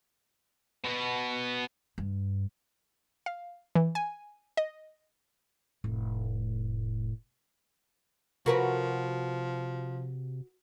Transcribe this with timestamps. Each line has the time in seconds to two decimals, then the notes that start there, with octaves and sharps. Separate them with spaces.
0.84 B2 B3
1.98 G2
3.26 F5
3.75 E3
3.95 G#5
4.57 D#5
5.84 F1 A2
8.46 C3 F3 F#4 A#4 B4